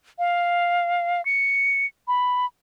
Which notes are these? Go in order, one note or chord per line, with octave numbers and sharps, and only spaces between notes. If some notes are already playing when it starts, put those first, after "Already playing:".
F5
C#7
B5